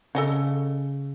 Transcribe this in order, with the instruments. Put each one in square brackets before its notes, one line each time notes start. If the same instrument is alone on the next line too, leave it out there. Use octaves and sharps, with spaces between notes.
[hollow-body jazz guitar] C#3 [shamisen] A4 D#5 F#5